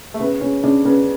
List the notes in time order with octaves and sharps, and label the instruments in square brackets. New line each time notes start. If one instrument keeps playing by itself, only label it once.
[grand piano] A3
[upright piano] C#3 [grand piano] B3
[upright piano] C#3 [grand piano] C#4
[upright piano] C#3 [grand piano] D4
[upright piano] C#3 [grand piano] B3